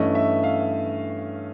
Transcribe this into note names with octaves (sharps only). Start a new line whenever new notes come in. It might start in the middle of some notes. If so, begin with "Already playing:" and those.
Already playing: G2 E3 A3 C#4 D#5
E5
F5